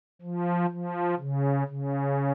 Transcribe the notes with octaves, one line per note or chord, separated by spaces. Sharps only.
F3
F3
C#3
C#3